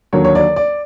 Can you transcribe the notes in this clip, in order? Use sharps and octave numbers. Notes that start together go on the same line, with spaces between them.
D#2 D3 F#3 A#3 C#5
C#5
D5
D5